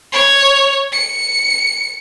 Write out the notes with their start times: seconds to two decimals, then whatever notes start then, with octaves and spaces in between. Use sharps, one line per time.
0.13 C#5
0.92 C#7